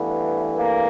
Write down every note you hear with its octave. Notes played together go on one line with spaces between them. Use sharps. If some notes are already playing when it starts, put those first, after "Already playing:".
Already playing: G2 E3 A3 B3
A#3